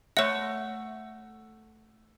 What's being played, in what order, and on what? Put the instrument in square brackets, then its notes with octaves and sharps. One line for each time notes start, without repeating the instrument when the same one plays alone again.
[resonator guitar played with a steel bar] A3 F#5 [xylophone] C#5 E5